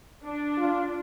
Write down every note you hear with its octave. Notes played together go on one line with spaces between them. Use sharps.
D4
F4